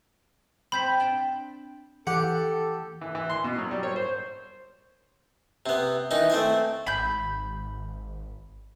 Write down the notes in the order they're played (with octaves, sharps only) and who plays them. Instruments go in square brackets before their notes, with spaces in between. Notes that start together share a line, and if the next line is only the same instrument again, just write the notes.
[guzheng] C4 A5 [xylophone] B5 G6 B6
[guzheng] D4 G5 A5
[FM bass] E3 [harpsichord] G4 [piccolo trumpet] A4 [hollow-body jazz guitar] F#5
[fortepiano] E3
E3
C6
B2
F#3
G3
C#5
C5
[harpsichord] C3 B3
D#3 E3 D#4
A3 C4 G#5
[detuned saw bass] G#1 [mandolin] B5 G6